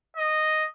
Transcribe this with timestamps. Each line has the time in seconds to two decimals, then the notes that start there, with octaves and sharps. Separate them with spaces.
0.17 D#5